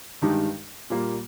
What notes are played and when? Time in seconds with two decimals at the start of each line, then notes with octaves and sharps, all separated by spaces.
0.22 G2 D#3 G#3 D#4 G4
0.90 A#2 G3 A#3